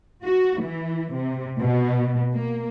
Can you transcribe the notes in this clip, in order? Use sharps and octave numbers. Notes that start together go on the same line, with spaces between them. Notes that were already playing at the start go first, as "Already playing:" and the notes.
F#4
E3
C3
B2
A#3